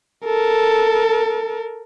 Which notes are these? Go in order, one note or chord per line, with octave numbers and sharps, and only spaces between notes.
A4 A#4